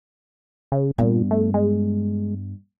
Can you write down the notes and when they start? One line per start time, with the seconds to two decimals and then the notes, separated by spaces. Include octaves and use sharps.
0.72 C#3
0.98 G2 A#2 B3
1.31 A3
1.54 G#3